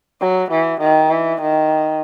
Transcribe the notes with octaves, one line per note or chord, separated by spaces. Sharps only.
F#3
E3
D#3
E3
D#3